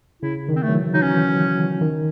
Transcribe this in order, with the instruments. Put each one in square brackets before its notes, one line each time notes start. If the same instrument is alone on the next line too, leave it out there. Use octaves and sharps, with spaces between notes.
[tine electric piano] C#3 [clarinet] E4
[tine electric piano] D#3
[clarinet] C4
A3
[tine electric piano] F#3
E3
[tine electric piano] F#3 [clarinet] D#4
[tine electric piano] E3 [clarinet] C#4
[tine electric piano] D#3